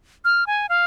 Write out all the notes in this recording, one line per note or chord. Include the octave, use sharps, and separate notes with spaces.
F6
G#5
F5